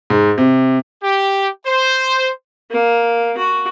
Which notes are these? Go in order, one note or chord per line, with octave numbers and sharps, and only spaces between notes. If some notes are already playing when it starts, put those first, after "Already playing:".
G#2
C3
G4
C5
A#3
F#4